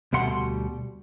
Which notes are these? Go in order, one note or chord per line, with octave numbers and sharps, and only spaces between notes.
D2 B2 G3 F#5 C6